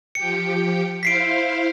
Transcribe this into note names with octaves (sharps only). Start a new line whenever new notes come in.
F3 G4 G5 C#7
E4 C5 F5 B6 C7 D7